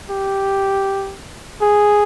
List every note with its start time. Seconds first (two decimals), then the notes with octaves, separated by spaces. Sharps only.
0.10 G4
1.61 G#4